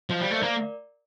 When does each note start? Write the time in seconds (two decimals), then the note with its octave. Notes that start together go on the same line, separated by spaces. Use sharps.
0.09 F3 C5 D#5
0.21 G3 D5 F5
0.31 A3
0.38 A#3 A#4 D5